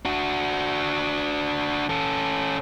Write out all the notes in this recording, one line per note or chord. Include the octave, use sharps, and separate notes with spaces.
D4 F#4
C#4 A4